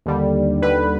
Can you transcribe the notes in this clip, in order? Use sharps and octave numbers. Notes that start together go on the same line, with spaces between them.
D#2 D3 G3
D#2 D3 G3 B4